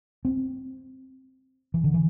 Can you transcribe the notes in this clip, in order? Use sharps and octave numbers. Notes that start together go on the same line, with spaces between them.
C4
E3
D3
E3